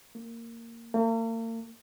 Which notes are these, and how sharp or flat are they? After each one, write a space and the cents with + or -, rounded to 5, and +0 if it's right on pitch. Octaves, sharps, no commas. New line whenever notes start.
A#3 -15
A#3 -45